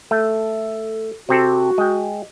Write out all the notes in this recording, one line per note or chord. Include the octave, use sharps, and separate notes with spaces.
A3 A4
C3 C4 F#4 A4
G#3 G5